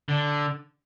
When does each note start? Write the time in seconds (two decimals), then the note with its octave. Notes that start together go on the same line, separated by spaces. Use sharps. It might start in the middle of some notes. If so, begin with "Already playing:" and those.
0.09 D3